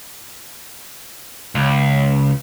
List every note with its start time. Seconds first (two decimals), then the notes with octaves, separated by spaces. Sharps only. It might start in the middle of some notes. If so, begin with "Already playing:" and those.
1.55 C#2